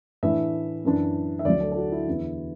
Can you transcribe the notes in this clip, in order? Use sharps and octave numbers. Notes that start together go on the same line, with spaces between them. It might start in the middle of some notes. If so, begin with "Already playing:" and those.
A2 E3 D4 E5
F#2 E3 D4
E5
D2 D3 F#3 D5
A4
A4
F#4
E4
E2 D3 B3